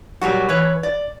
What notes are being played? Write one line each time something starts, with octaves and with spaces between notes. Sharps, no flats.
A#2 F#3 G3 F#4
E3 B4 C#5
D5